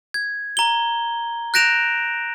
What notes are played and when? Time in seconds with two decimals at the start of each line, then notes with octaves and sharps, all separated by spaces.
0.14 G#6
0.57 A#5 G7
1.54 F#6 G6 A#6 D7 E7 F7